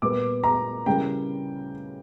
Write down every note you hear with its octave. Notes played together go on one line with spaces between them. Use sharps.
A#2 G3 B3 D6
A#5
C#3 E3 G3 A#3 G5